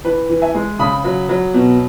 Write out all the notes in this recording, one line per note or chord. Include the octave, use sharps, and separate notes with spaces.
E3 B4
E3
E5 G#5
G#3
C#3 B5 D#6
F#3
F#3
B2